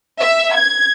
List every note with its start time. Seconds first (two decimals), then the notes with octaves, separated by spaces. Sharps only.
0.20 E5
0.54 G#6